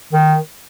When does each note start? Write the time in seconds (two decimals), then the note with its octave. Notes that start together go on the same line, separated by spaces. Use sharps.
0.13 D#3